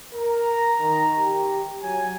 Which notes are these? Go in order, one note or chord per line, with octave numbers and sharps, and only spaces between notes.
A#4 A#5
D#3
G4
F#3 G#5